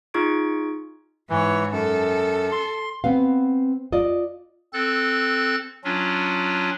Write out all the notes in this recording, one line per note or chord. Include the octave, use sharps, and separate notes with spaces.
D#4 F4 G#4 C#6 G#6 D7
G#2 E3 C#5
F#2 A4
C6
B3 C4 B4 F5
F4 D5 D#5
C4 A4 F#6 A6
F#3 C#4 D4 F4